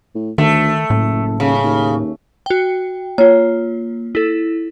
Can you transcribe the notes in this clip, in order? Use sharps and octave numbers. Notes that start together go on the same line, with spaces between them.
A2
D2 D#3 A3
F#1 A2
D#1 C#3
D#2
F#4 G5
A#3 F4 C#5
E4 A4